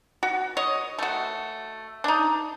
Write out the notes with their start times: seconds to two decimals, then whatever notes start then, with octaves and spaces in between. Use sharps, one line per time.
0.23 F#4
0.57 C#5 D#5
0.99 A3 F#4
2.04 D4 D#4